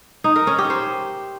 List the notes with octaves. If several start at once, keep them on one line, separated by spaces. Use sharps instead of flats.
D#4
A#4
C#4
G4
C5